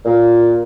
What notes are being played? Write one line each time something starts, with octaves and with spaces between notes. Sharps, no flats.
A#2